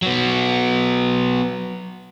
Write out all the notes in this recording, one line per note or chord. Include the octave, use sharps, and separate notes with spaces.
F#3 B3